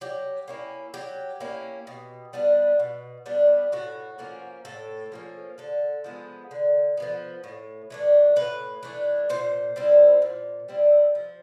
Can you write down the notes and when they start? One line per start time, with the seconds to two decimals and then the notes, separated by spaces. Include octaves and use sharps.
0.01 F#3 G4
0.48 A#3 C#4 E4
0.94 F#3 G4
1.40 A#3 C#4 E4
1.87 B2
2.33 G3 B3 D4
2.79 B2
3.26 G3 B3 D4
3.72 A2 F#4
4.18 F3 A#3 C#4
4.65 A2 A4
5.12 F3 A#3 C#4
5.58 D3 A4
6.04 F3 G#3 B3
6.51 D3
6.97 F3 G#3 B3
7.44 A2
7.90 E3 A3 D4
8.36 A2 B4
8.83 E3 A3 D4
9.29 A#2 C5
9.76 G3 C4 E4
10.22 A#2
10.68 G3 C4 E4
11.15 F3